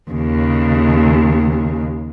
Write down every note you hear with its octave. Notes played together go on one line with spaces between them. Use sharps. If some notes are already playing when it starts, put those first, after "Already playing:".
D#2 C#3